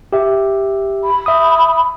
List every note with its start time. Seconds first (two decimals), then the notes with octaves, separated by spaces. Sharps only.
0.13 G4 E5
1.04 B5
1.26 E5 D#6